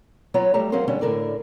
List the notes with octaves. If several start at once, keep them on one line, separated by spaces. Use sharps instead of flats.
F#3 B3 F4 C#5 A#5
F#3 G3 A3 G4 A#5
F3 F#3 C#4 G#4 A#4 C5
D3 G3 B3 C#4 D4
A2 D3 A#4 D5